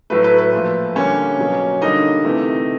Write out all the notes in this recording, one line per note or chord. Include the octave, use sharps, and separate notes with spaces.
A2 F#3 A3 B4
B4
B4
A#2 F3 A3
D3 G3 A#3 C#4 C#5
B2 F#3 A#3
D3 G3 A#3 D#4 D#5
C3 E3 A3